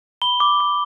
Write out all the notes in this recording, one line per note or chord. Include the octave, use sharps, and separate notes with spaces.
B5 G7
D6
D6